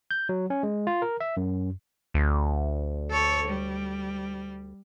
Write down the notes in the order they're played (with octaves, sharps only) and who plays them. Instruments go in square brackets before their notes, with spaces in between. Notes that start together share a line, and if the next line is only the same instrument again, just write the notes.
[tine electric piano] G6
F#3
C#4
G#3
F4
A#4
E5
F#2
[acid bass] D2
[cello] A4 C#5
G3